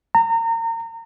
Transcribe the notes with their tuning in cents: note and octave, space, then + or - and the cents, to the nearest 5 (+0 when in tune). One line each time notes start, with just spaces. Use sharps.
A#5 -30